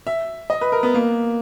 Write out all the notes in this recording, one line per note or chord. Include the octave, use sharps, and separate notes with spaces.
E5
D#5
B4
A#4
B3
A#3